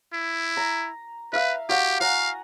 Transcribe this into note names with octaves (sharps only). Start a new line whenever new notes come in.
E4
A#5
B4 E5 F5
F#4 G4 F5
F5 F#5 G#5 A#5